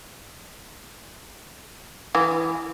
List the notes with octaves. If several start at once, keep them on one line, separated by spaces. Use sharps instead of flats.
E3